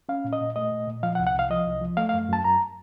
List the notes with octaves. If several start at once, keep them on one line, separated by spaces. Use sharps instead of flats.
C#4 F5
A#2
D#5
A#2
A3 D#5
A#2
A#2
F3 F5
F#5
C2
F#5
C2 F5
F3 D#5
C2
F3
A3 F5
F5
F#2
F#2 A5
F#2 A#5